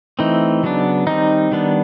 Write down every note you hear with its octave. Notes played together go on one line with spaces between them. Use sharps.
E3 A3 C4 D#4
C#3 F#3 B3 D4
D#3 G3 C4 D#4
D#3 G3 B3 D4